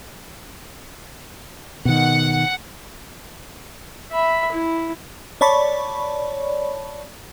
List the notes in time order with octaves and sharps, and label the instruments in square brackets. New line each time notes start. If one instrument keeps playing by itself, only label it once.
[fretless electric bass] B2 D#3 [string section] F#5
[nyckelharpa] E5 B5
E4
[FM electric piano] C#5 D5 A5 B5 C#6